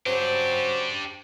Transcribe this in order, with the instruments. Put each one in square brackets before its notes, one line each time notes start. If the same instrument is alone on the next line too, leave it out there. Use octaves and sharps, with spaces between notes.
[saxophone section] C#3 F#3 C5 [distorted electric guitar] D4 G4